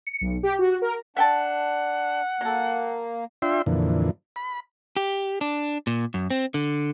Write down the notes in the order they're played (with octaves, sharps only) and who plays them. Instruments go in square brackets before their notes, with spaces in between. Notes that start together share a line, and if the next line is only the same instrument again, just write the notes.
[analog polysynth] C#7
B1
G4
F#4
A#4
[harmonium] D4 [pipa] E5 G5 A5 [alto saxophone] F#5
[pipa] F#3 A4 [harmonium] A#3
[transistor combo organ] D4 F4 E5 G5 C6
F2 A#2 D3 E3
B5
[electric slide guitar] G4
D4
A#2
F#2
C4
D3